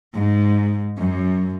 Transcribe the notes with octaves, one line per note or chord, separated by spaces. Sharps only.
G#2
F#2